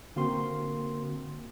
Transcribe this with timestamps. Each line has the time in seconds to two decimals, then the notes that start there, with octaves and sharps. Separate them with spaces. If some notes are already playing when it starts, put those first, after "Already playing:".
0.16 D3 A#3 C4 F#4 A#4 C6